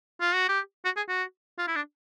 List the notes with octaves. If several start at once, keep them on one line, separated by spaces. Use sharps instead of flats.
F4
F#4
G4
F#4
G#4
F#4
F4
E4
D4